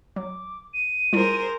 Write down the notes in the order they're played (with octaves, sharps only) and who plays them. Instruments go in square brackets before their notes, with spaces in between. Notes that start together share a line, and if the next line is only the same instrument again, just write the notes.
[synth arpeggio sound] F#3 [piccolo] D6
[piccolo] D#7
[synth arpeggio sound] G3 E4 F4 [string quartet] G#4 A#4 C5